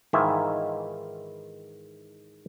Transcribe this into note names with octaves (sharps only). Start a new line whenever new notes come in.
G#2 D#3 E3 E4 F4 E5